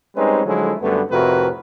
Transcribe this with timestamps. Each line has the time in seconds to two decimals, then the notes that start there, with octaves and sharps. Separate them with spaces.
0.16 G3 G#3 C4 C#4 D#4 B4
0.46 D3 F3 F#3 G#3 A3 E4
0.81 F#2 D3 G3 A3 B3
1.11 F2 A2 C3 F#4 A#4 B4